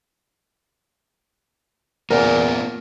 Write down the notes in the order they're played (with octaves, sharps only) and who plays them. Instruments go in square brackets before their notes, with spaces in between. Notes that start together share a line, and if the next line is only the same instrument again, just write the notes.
[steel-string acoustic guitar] E2 [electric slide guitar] A#3 C#4 F4 [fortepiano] A#4